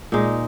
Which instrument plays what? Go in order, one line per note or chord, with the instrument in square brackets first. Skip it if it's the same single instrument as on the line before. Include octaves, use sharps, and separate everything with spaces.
[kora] A#2 G#3 D#4